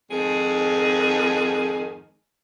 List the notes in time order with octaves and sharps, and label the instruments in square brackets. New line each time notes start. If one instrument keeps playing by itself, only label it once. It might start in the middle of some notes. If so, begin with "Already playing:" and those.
[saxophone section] F2 G#2 D#3 G#4